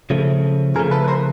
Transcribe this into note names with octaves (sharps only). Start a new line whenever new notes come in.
C#3 F3 A3
C#3 F3 A3 G#4 A#4
A4 B4
B4
A#4 C5